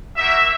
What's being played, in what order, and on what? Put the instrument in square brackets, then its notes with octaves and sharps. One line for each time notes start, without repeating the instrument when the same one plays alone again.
[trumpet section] A#3 D#4 F#4 E5